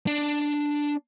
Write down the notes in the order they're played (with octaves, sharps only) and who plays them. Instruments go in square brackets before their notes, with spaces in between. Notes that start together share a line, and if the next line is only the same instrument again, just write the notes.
[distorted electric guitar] D4